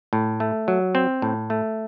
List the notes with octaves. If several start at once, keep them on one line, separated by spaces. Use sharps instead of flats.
A2
A3
F#3
C4
A2
A3